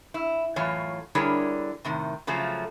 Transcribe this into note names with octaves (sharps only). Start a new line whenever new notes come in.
E4
F#2 A2 E3 F4 C#5
D3 G3 E4 G#4 A#4 C#5
A2 C3 D#3
C#3 F3 F#3 A3